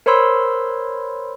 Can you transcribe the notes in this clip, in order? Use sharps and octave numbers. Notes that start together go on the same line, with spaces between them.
A#4 C5 C#5 B5 C6 E6